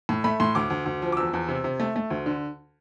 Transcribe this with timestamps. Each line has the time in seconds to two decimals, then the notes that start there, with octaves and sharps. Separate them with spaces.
0.09 A2
0.24 A3 B5
0.40 A2 C6
0.55 D2 D6
0.70 D2
0.86 D2
1.02 F3
1.12 D6
1.17 E2 E6
1.34 E2
1.48 C3
1.64 C3
1.80 A3
1.96 A3
2.10 D2
2.26 D3